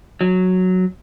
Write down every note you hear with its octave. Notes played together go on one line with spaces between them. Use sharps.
F#3